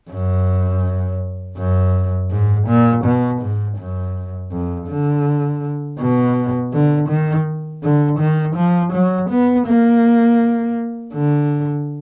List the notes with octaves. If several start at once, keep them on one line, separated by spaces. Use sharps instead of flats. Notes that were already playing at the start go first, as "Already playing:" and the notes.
F#2
F#2
G#2
A#2
B2
G#2
F#2
F2
D3
B2
D3
D#3
D3
D#3
F3
F#3
B3
A#3
D3